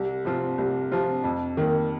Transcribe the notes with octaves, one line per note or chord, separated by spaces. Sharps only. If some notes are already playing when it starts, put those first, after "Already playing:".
Already playing: C2
C3 F3 C4 F4
C2
C3 F3 C4 F4
F2
D#3 A#3